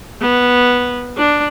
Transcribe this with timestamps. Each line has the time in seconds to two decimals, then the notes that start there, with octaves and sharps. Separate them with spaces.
0.21 B3
1.18 D4